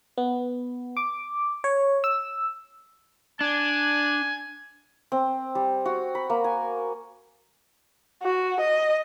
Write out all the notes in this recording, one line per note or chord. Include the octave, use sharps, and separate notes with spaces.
B3
D6
C#5
E6
D4 G#5
C4
G3
F#4
B5
A#3
G#5
F#4
D#5